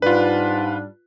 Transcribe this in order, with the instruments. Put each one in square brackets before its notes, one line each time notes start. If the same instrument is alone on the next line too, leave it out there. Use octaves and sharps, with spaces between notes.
[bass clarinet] G#2 [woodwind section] G3 D4 [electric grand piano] F4 B4